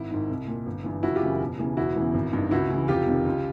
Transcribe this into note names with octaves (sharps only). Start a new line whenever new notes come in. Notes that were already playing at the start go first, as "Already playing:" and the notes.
Already playing: G#1 E4
G#2 D#3
C2
A#2
G1
G2 E3
F#1 E4 F#4
F4 G4
F#2 C#3 E3
E1
E2 C#3 E3
E1 E4 F#4
E2 C#3 E3
G#1
G2 D#3
C#2 E4 F#4
C#3 E3
F1 F4 G4
F2 C3 D#3
C#2